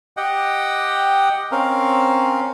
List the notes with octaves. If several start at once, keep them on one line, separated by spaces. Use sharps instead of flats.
G4 D#5 F#5 G5
C4 C#4 A#4 F5